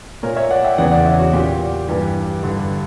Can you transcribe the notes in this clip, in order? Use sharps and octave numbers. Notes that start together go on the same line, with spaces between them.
A#2 A#4 C#5
C#5 E5
D5 F#5
E5 G5
E2 C#3 E3 D5 F#5
D5 F#5
C#5 E5
F#4
A#2 G4
G2 E3 G4
G2 D3